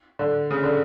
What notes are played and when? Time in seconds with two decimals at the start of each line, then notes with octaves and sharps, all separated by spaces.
0.19 D3
0.51 C#3
0.64 D3